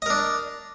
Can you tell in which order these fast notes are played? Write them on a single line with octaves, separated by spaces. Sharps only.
D#5 A#4 D4